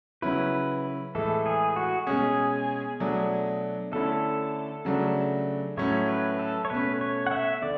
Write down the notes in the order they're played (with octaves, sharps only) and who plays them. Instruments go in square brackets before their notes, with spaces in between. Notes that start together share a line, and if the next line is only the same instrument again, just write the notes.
[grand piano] C#3 F#3 C#4 E4 [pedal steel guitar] B4
[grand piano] A2 E3 G#3 [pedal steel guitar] A4
[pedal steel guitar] G#4
F#4
[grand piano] B2 G#3 C#4 [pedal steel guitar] G#4
[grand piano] B2 F#3 A3 D4
[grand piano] D3 A3 C#4 E4 [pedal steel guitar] A4
[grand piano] C#3 F#3 A3 D4
[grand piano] A2 F#3 A3 C#4 [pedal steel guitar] C#5
[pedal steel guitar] B4
A4
C#5
[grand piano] B2 A3 C#4 [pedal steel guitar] B4
[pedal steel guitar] C#5
F#5
E5
[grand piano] D3 [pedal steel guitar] D5